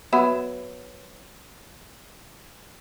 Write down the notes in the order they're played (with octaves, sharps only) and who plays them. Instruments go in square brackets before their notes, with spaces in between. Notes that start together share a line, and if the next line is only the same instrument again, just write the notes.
[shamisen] F#3 B3 E5